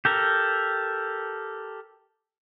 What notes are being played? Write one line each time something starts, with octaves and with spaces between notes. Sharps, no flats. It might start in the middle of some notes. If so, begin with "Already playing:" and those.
G4 A4 A#4